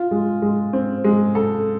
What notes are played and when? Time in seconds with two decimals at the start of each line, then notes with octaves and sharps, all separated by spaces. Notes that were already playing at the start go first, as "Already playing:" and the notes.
Already playing: F4
0.11 G#3
0.42 G#3
0.73 C4
1.04 G#3
1.35 A4